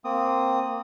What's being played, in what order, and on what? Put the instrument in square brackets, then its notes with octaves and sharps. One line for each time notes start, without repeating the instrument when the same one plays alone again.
[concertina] A#3 C4 D#6